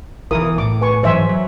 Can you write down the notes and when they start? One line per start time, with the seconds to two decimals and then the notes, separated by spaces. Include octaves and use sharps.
0.31 B1 E3 E4 A#4 D#6
0.58 A2 D6
0.81 B4 G#5 C#6
1.03 G#2 E3 F#3 C5 E5 G#5
1.29 F#3